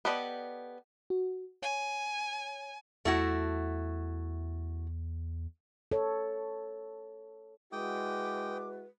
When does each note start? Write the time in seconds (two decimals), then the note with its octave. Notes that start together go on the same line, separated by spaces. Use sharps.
0.05 B3 G4 A4 D5 D#5
1.10 F#4
1.62 C#5 G#5
3.05 E2 A3 E4 F#4
5.92 A4 C#5
7.72 G#3 E4 F#4 B4 G5 D6 D#6